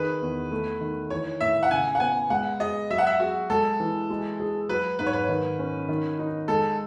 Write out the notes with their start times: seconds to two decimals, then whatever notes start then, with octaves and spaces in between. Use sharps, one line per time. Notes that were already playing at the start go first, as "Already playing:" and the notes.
Already playing: D#3 G#4 B4
0.22 E2
0.51 A3
0.81 D#3
1.10 E3 C#5
1.41 A2 E5
1.63 F#5
1.71 C#3 G#5
1.95 F#5
2.00 B3 G#5
2.30 G#3 F#5
2.60 G#4 D#5
2.90 F#3 E5
2.98 F#5
3.07 E5
3.20 F#4 G#4
3.50 G#3 A4
3.80 E3
4.10 G#3
4.40 G#4
4.69 F#3 B4
4.99 G#2 B4
5.06 C#5
5.13 B4
5.29 D#3
5.59 C#4
5.89 D#3
6.19 D#4
6.48 G#3 A4